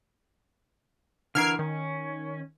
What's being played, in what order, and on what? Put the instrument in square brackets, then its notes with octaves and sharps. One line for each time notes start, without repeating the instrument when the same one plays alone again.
[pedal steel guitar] D3 E3 A#4 [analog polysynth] F6 G#6 C7
[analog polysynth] D#3 [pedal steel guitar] C#4